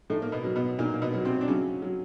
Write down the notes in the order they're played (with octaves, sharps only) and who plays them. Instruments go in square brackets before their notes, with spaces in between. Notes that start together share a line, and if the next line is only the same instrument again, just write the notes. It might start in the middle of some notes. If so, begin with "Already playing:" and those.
[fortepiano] A2 A3 [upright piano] D#4
[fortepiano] A#3
B2 B3
[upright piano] F#3
[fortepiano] B2 B3
[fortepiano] A#2 A#3 [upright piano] D#4
[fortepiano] A#3
B2 B3
[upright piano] F#3
[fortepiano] C3 C4
D4
[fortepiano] C#3 C#4 [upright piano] F#3
[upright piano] F#3